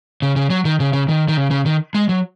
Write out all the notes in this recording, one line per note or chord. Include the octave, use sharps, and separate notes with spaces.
C#3
C#3
F#3
D#3
C#3
C#3
D#3
D#3
C#3
C#3
D#3
G#3
F#3